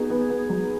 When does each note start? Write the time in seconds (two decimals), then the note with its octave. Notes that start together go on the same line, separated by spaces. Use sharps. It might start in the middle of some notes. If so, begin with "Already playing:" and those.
Already playing: B3 D#4 F#4 G#4
0.10 B3
0.30 B3
0.50 F#3